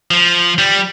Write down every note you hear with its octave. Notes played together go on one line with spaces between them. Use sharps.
F3
G3